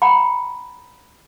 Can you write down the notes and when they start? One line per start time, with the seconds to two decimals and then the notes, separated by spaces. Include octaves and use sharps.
0.02 F#5 G5 A#5 B5